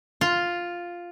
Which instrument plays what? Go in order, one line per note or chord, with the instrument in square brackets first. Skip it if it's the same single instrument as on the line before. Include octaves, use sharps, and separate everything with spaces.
[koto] F4